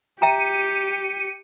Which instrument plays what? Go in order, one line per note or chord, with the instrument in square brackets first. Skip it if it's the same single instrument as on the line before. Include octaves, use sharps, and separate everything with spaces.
[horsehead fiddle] G4 [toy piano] E5 G5 A#5 [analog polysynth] C#7 D#7